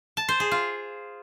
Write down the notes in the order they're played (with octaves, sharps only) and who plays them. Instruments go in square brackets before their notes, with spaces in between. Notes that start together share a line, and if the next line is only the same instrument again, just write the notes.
[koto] A5
C5
G#4
F4